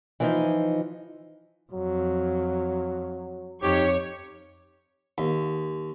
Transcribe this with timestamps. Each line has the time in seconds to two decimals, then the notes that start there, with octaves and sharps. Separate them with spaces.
0.20 E3 F3 D#4
1.72 F2 F#3
3.63 F2 D#4 G4 C#5
5.18 D#2